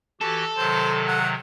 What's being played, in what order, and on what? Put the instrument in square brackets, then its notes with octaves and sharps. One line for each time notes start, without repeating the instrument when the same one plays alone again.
[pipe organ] E3 F#4 G4 [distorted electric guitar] A4
[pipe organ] C3 D#3 F#3 [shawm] C5
[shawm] F#5